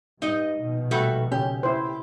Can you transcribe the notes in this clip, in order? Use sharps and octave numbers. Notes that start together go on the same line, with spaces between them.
G2 D#4 D#5
A#1 B2 D#3
G3 A3 F#4
C#3 C#4 G4
E4 C5